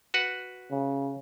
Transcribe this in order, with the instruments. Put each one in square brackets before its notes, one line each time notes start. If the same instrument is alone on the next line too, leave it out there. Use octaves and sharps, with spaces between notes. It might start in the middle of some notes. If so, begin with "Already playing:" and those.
[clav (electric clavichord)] F#4 B4 F#5
[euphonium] C#3